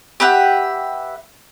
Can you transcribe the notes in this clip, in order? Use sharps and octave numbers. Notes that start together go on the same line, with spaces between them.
G4 B4 E5 F#5